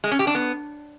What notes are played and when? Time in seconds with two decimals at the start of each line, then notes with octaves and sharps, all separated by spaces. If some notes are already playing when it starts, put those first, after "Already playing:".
0.04 G#3
0.11 C#4
0.19 G4
0.27 D4
0.35 B3